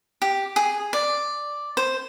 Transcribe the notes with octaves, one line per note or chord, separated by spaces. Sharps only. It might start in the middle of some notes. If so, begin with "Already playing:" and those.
G4
G#4
D5
C5